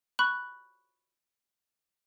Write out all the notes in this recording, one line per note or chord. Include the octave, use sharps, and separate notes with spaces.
B5 C#6 F#6